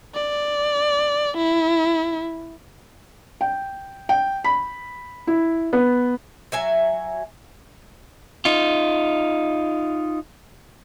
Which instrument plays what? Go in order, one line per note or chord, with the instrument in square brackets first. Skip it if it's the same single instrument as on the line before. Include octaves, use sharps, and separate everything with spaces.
[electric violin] D5
E4
[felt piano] G5
G5
B5
E4
B3
[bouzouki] F#3 E5 G#5
[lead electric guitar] D#4 F4